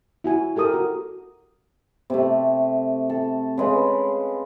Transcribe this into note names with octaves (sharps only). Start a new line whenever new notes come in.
E4 F#4 G#5
G4 A4 A#4 D#6
F#4
C3 A3
A4
C#3 G#3 B4